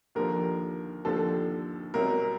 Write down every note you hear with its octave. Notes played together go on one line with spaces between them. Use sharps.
D#2 D3 F3 A#4
D#2 D3 F3 A4
C2 B2 F#3 A#4